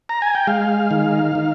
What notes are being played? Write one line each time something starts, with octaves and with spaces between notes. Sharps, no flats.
A#5
G#5
G5
G#3 F5
D#3
D#3